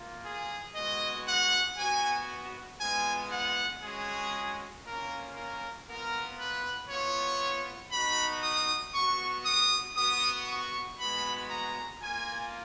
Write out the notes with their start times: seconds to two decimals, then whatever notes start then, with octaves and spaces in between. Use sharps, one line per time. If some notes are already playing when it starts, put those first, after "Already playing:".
Already playing: A#3 F4
0.24 G#4
0.75 G#3 B3 F#4 D#5
1.27 F#5
1.77 B3 F#4 G#5
2.81 G#3 B3 F4 G#5
3.32 F#5
3.82 G#3 C#4 F#4 G#4
4.84 A#3 C#4 F4 A#4
5.36 A#4
5.87 B3 F4 A#4
6.39 B4
6.89 B3 F4 C#5
7.92 B3 D#4 F#4 B5
8.43 D#6
8.94 B3 F#4 C#6
9.46 D#6
9.96 B3 F#4 D#6
10.48 C#6
10.99 G#3 B3 F#4 B5
11.50 A#5
12.01 A#3 F4 G#5